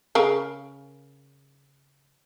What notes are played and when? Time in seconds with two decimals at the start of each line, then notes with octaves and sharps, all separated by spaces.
0.15 C#3 A#4 F5